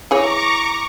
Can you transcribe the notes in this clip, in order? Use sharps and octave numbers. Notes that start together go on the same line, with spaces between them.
E3 G#4 C#5 A#5 C#6 D6